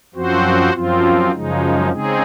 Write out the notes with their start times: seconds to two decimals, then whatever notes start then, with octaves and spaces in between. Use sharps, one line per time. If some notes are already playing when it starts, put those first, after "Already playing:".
0.15 F#2 F3 C4 F#4 C5
0.74 F#2 F3 C4 F4
1.33 F#2 C#3 F3 G#3 D#4
1.92 C#3 G#3 C4 D#4 G#4